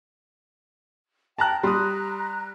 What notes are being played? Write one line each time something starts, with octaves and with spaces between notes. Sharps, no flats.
G5 A5 A#5 F#6
G3 A#5 C6 D#6 F#6